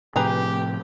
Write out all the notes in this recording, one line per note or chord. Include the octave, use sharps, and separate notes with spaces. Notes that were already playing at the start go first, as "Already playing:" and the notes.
A2 C3 F3 G4 G#4 B4 G5 A#5